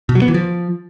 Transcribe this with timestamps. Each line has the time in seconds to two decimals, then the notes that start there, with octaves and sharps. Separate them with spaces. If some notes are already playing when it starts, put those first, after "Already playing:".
0.09 B2
0.15 F#3
0.22 B3
0.28 E3
0.34 F3